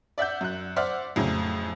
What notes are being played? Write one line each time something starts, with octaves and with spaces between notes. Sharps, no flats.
D5 E5 F#5 E6 G6
F#2 F#6
C5 D5 E5 F#5 D6 F6
F2 A2 C#3 F#3